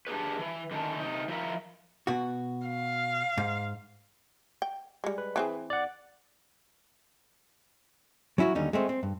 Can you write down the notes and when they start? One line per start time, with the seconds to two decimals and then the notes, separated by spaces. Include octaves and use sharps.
0.07 D4 G4 G#4 B4
0.39 E3
0.71 D3 D#3 A3 C#4 A5
0.99 C3 D#4
1.28 F3 E4 A#4 E5
2.07 B2 F#4
2.67 F5
3.37 G#2
4.62 G5
5.04 G3 G#3
5.18 B4
5.36 E3 C4 G#4
5.70 D5 F#5
8.38 F#3 C#4 E4 F#4 C#5
8.55 D#2 D3 G3 C#4 D#4
8.73 G#3 A3 C4 C#4
8.89 C4
9.03 G2